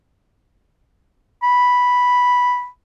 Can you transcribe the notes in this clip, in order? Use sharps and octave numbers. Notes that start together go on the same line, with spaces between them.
B5